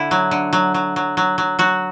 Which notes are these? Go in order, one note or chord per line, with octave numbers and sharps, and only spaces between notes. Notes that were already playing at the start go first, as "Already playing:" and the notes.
Already playing: D3 E4
F#3
D3
F#3
F#3
F#3
F#3
F#3
F#3 F#4